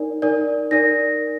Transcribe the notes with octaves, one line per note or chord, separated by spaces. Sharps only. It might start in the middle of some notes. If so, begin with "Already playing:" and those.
Already playing: D#4 A#4 D5
D#4 A#4 D5
D#4 A#4 D5 A#6